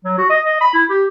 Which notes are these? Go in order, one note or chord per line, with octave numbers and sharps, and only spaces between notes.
F#3
F#4
D#5
D#5
B5
E4
G4